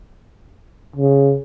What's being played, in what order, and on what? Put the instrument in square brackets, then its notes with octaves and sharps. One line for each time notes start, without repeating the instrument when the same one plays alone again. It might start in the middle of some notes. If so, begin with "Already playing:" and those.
[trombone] C#3